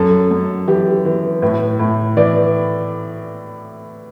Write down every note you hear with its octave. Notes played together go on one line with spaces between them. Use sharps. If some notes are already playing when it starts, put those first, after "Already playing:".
Already playing: F#2 A4
F#2
E3 G4
E3
A2 B4
A2
E3 D5